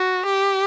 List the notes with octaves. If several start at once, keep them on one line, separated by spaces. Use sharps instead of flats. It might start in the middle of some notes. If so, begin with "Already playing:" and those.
Already playing: F#4
G4